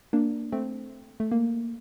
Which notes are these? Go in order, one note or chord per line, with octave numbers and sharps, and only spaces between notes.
A#3 D4
A3 C4
A3
A#3